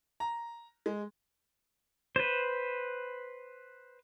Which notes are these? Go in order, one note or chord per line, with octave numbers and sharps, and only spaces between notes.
A#5
G#3
B4 C5